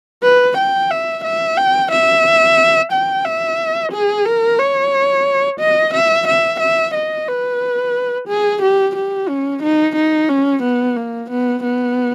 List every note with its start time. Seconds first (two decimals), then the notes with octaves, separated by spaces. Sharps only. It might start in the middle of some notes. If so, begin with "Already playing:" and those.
0.23 B4
0.58 G5
0.91 E5
1.24 E5
1.57 G5
1.91 E5
2.92 G5
3.25 E5
3.92 G#4
4.25 A#4
4.59 C#5
5.60 D#5
5.94 E5
6.28 E5
6.60 E5
6.94 D#5
7.28 B4
8.28 G#4
8.62 G4
8.96 G4
9.28 C#4
9.63 D#4
9.96 D#4
10.29 C#4
10.63 B3
10.96 A#3
11.30 B3
11.63 B3